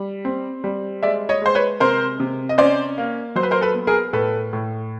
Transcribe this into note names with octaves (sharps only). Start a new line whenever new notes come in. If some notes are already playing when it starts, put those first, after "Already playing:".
Already playing: G3
C4
G3
G#3 D5 E5
C#5 D#5
G#3 C5
B4 C#5
C3 A#4 C5
C3
D#5
C#4 C5 D5
A#3
F#3 C5
B4
A#4 C5
A4 B4
B3
G#4 A#4
A2 A4 B4
A2